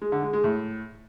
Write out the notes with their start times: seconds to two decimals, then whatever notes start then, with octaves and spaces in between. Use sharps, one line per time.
0.02 G#3
0.12 D3
0.23 G#3
0.33 G#3
0.44 A2